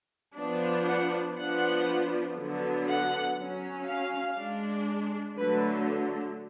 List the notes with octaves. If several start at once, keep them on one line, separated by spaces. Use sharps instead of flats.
F3 B3 D4
F#5
F3 B3 D4 F#5
D3 F#3 B3
F#5
F#3 C#4
F5
G#3 D4
D3 F#3 A3 B4